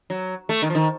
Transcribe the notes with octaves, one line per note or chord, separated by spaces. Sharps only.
F#3
A3
D#3
F3
D#3